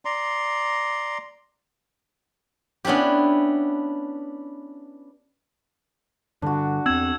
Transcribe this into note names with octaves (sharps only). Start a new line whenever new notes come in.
D5 A#5 C6
B3 C#4 D4 E4 G4
G2 D3 D4 F#4
E2 C4 E6 G#6 E7